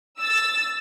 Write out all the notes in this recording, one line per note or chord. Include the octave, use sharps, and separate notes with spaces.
E6 A6